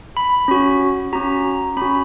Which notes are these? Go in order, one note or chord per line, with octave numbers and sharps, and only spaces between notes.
B5
C#4 F#4
C#4 F#4 A#5
C#4 F#4 B5